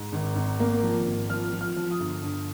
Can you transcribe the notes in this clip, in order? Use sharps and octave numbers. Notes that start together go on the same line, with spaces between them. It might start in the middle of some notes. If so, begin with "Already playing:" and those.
Already playing: G#2
G#1
G#1
A#3
F3
G#1
F3 F6
F3
F6
F3
D#6
G1
G2